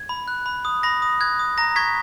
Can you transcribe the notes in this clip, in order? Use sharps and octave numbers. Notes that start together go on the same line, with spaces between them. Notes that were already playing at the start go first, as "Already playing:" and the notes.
Already playing: G#6
B5
F#6
B5
D#6
B5 A#6
D#6
F#6 G#6
D#6
A#5 A#6
C#6 G#6 B6